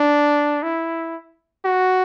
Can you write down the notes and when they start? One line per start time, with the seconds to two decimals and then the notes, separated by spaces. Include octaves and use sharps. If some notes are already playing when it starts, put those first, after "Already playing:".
Already playing: D4
0.63 E4
1.65 F#4